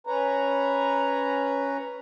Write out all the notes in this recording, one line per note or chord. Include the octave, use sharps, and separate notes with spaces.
C#4 B4 C#5 A#5